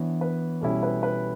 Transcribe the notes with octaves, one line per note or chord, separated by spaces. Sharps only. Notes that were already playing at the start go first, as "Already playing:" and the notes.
Already playing: E3 B3 D4 C#5
B4
B2 G3 C#4 E4 A4
B4
B4